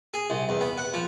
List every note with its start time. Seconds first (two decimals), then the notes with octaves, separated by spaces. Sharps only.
0.14 G#4
0.30 C2
0.49 E2
0.61 B3
0.78 F#5
0.94 F3